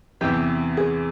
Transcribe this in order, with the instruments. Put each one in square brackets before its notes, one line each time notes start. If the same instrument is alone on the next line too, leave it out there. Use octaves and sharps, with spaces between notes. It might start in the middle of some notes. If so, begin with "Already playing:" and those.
[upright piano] E2 C3 E3 [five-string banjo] G4
[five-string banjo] G#4